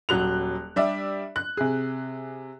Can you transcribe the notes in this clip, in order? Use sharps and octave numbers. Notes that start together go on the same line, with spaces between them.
D#1 F#3 F#6 F7
G3 D4 G4 D5 E5
F#6
C3 G#4